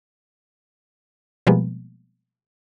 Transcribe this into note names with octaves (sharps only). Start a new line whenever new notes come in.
B2 F3 G3 G#3 A#3 B3